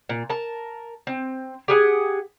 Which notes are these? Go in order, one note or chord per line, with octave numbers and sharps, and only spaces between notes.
A#2
A#4 A5
C4
G4 G#4 F#5